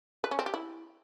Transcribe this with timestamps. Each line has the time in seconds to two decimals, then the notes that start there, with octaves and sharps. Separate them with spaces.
0.24 B4
0.31 C#4
0.39 C4
0.46 G4
0.54 E4